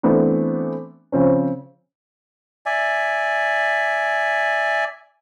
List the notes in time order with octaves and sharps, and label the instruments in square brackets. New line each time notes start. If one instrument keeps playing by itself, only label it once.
[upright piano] E3 A3 B3 C4 D4
C#3 F3 C4 C#4
[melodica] D5 E5 G#5